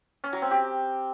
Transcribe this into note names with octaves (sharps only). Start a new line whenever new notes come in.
C#4
F#3
C4
G4